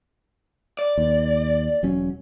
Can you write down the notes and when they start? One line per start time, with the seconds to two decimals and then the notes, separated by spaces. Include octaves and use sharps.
0.79 D5
0.98 D#2
1.83 E1 F#3 C#4